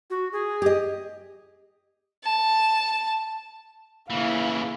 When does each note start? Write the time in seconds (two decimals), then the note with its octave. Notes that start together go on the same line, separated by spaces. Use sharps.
0.10 F#4
0.32 G#4
0.62 G4 D#5
2.24 A5
4.10 C#3 E3 A#3 E4 F5